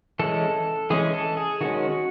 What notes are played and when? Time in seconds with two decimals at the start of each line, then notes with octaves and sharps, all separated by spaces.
0.19 E3 G#3 C#4 A4
0.90 E3 G#3 C#4 G#4
1.14 A4
1.37 G#4
1.61 D#3 G#3 C#4 F#4